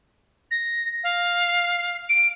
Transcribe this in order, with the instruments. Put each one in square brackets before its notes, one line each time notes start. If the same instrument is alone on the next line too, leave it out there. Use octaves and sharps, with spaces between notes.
[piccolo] A#6
F5
D7